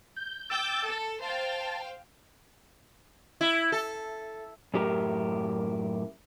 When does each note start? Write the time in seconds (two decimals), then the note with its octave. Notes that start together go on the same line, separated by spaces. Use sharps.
0.16 G6
0.50 G5 D6 E6 G6 A6
0.85 A4
1.21 C5 F5 G5 A5
3.41 E4
3.72 A4
4.74 F#2 A2 G4 A#4